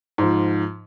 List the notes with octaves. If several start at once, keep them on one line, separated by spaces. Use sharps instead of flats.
G#2 F3